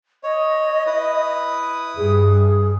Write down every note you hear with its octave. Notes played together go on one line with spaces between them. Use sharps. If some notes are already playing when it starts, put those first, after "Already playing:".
C#5 D#5
E4 B4 D#6
G2 G#4